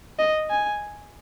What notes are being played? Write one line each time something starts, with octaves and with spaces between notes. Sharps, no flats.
D#5
G#5